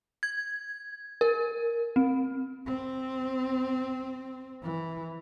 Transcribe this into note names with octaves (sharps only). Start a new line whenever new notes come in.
G#6
A#4
C4
C4
E3